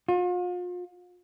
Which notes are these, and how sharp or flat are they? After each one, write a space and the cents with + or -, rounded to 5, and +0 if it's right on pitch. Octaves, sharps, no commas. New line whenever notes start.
F4 +40